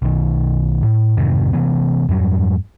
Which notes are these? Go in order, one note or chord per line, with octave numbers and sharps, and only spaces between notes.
B1 D#3
A2
F2 G#2 C3 D#3
C3 E3 B3
F2 G#2 F#3 G3